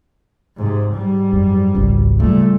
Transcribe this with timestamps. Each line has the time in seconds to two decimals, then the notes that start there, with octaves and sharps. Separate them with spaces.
0.57 G#2 C3
0.94 G#2 G3
1.33 F#2
1.75 G#1 C#2
2.20 A#2 C#3 G3 A3